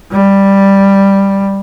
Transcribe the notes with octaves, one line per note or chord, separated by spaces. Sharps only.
G3